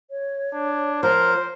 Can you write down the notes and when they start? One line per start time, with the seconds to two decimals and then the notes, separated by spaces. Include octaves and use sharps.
0.11 C#5
0.54 D4
1.03 F3 A#4 C5